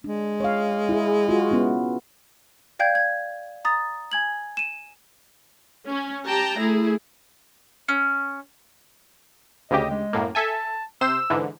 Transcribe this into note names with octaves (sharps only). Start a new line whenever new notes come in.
G#3 D4
C#5 F5
E4 G#4
F4 F#4
B3 C#4 E4
D5 F5 G5 G6 G#6
G#6
A#5 D#6 A6
G#5 G#6 F#7
D#7 E7
C#4
G4 G5 A5 A#5
A3 E4 G#4
C#4
D2 C#3 G4 D#5
G#3
F#2 A2 A#3
A4 E5 G#5 A5
C3 C5 E6 E7
G#2 D3 E3